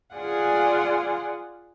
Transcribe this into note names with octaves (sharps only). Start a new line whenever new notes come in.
F4 G#4 D5 F5 F#5 G#5